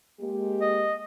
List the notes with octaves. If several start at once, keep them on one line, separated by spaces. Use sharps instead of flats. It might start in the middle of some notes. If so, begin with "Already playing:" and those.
G#3 A#3 G4
D#5